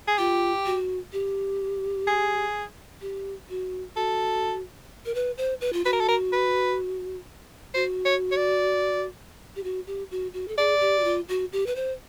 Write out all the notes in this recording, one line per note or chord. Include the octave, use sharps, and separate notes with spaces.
G#4
F4 G4
F#4
G4
G#4
G4
F#4
F#4 A4
A#4
B4
C5
B4
F4
F#4 B4
A#4
A4
A#4
B4
F#4 C5
C#5
C#5
D5
G4
F#4
G4
F#4
F#4
A4
G#4 D5
G4
F#4
F4
F#4
G4
B4
C5